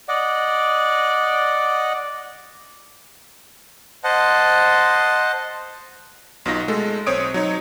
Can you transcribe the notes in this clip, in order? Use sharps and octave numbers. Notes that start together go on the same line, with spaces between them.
D5 D#5 F#5
C5 D#5 F#5 A5
B1 B2 D#4 F4 A#6
G#3 A3 A4
B1 C4 C5 C#5 D#6 D7
F#3 D#4 C#5